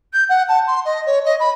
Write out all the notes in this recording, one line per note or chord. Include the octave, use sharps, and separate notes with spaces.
G6
F#5
A5
C6
D#5
C#5
D#5
B5